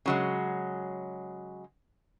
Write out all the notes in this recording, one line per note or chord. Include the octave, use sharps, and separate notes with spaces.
C#3 F#3 G#3